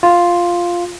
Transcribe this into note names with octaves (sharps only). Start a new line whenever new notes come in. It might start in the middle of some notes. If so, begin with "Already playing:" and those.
F4